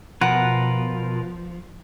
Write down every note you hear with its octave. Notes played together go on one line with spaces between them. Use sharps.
B2 F3 F4 A#4 B4 F#5